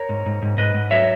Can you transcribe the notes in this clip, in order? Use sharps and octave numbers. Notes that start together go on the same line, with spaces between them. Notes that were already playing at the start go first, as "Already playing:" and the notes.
Already playing: A#4 C#5
G#2
G#2
G#2
G#2 B4 D#5
G#2
F#3 C#5 E5